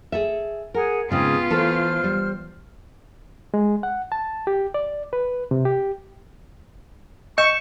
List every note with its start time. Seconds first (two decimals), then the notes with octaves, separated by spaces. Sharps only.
0.12 G#4 A4 E5
0.74 G#4 A#4 F#5 G#5
1.11 G#2 C#3 B3 C4 F4 G#4 G5 D#6
1.50 E3 A3 A4 C5 F6
2.04 G3
3.54 G#3
3.83 F#5
4.12 A5
4.47 G4
4.74 D5
5.13 B4
5.51 C3
5.65 G4
7.38 D#5 C#6 G6 C#7 E7